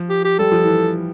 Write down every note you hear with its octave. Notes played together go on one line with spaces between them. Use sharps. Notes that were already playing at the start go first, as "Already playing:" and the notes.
Already playing: F3
G4
G4
G3 A4
F3
E3